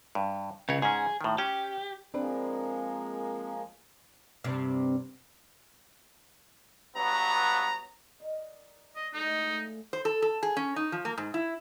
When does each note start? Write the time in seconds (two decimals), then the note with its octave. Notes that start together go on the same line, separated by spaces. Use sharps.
0.15 G2
0.69 C#2 C#3 C#5
0.82 G#2 C#4 G#4
1.21 A2 D#3
1.38 C#4 G4
2.14 F3 G#3 A#3 C4 D4 B4
4.44 G2 C3 G3
6.97 G2 F#3 B3 A#5
8.19 A#4 D5 D#5
8.96 D5 D#5
9.13 A2 F#3 G#3 D#4
9.39 F3 A3 D4
9.93 C5
10.05 A4
10.22 A4
10.43 G#4
10.57 C#4
10.76 D#4
10.92 F3
11.05 A#3
11.18 G#2
11.34 E4